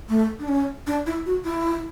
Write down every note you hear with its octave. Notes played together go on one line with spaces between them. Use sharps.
A3
D4
C#4
D4
E4
F#4
E4